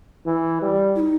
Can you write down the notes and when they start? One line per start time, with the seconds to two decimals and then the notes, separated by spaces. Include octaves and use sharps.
0.26 E3
0.62 G3
0.96 E4
1.00 D#4